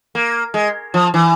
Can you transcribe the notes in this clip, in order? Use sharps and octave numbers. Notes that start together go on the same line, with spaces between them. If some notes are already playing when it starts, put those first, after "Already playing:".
A#3
G#3
F3
E3